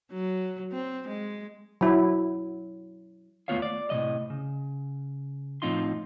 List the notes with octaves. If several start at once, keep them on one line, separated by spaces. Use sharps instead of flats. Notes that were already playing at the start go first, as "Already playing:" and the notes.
F#3
C4
G#3
F#3 E4
D#2 A3 B3 F4 C#5 F5
D5
A2 C3 F3 D#5
C#3
A2 F3 C4 D#4 F4 C6